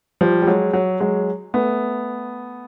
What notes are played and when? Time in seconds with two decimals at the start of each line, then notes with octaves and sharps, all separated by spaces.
0.21 F3 G3
0.42 G3
0.47 F#3 G#3
0.73 F#3
1.00 F#3 G#3
1.54 A3 B3